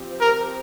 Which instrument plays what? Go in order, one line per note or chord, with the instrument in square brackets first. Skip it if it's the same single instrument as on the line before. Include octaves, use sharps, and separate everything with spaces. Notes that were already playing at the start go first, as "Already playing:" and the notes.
Already playing: [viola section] F3 C4 G4
[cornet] A#4